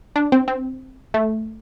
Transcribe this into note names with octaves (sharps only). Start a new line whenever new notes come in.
D4
C4
C4
A3